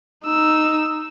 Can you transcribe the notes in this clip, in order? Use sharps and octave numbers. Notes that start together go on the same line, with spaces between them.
D#4 E6